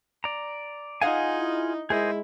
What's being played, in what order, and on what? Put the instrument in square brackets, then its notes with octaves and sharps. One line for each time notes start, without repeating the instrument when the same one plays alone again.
[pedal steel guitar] D5 A#5
[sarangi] D#4 [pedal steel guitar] F4 G#4 G#5 [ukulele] D#5 F5 F#5
[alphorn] E4
[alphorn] G#3 [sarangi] E4 [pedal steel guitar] G#4 C5 D#5 [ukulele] A#4